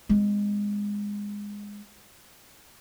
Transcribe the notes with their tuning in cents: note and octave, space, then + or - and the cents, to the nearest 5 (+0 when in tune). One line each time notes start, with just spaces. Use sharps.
G#3 -20 B3 +45